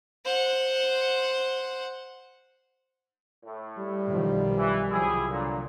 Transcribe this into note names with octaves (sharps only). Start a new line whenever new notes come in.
C5 F#5
A2
G3
B1 D#3 F3
E3
C2 F3 F#3 E4 G4 G#4
A#2 D3